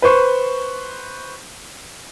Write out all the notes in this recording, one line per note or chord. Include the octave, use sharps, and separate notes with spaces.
B4 C5 C#6